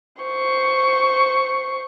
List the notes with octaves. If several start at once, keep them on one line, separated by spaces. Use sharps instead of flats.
C5 C#6